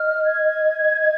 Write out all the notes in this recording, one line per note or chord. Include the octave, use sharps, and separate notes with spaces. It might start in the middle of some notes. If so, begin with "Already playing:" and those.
Already playing: D#5 F6
G#6